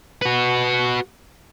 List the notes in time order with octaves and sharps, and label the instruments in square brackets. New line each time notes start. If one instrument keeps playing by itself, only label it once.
[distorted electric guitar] F#4 B4